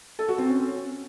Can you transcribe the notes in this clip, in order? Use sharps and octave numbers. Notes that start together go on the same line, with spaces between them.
A4
F#4
C4
C#4